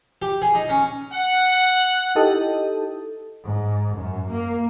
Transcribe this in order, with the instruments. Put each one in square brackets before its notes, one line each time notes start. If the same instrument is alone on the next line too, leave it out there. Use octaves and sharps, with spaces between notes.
[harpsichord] G4
G#4
D#4
C#4
[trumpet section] F#5
[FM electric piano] D#4 E4 G4 A4 D#5
[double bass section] G#2
F#2
A#3